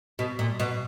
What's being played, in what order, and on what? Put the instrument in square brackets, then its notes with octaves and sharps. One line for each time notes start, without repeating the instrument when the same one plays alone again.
[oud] B2
A#2
B2